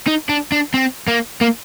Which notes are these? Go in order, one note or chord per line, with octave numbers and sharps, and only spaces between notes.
D#4
D4
D4
C4
A#3
A#3